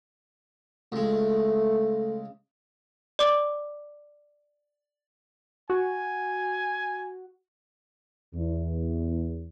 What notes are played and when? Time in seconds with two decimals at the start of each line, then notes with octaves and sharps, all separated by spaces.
0.92 C#2 G#3 A3
3.19 D5 D6
5.70 F#4 G#5
8.34 E2